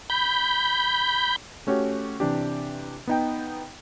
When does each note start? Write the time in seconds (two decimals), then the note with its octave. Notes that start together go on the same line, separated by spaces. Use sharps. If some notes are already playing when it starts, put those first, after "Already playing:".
0.10 B5 G6
1.67 A3 C#4 F#4 G4 C#5
2.20 C3 E3 D4 G4
3.07 B3 D#4 G5